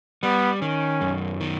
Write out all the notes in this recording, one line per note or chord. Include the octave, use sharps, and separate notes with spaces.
G3 B3
D#3 C#4
F#2
D#3